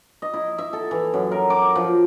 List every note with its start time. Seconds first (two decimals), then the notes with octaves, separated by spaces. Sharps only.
0.22 D#5
0.34 E4
0.58 E5
0.73 A4
0.91 E3
1.14 F#2
1.31 A#4
1.50 D6
1.75 F3